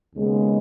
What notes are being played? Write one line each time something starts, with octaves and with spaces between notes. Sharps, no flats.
D#2 C#3 G#3 B3